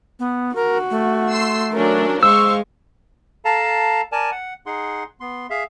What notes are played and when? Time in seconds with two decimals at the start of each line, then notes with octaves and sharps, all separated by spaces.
0.19 B3
0.55 F#4 A#4
0.91 A3
1.31 C6 E6 C7
1.73 F#3 C#4 D4 A#4
2.23 G#3 C5 F5 C#6 E6
3.45 A4 F5 A5 A#5
4.12 A#4 D5 G#5 A5
4.31 F#5
4.66 D#4 G#4 F#5 C6
5.20 B3 C6
5.50 G#4 E5 F5